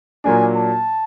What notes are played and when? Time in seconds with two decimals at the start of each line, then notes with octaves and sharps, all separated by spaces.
0.24 A#2 F#3 A#3 D4 G#5
0.56 A5